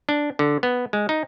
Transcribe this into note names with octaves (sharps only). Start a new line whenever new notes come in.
D4
D3
B3
G#3
D#4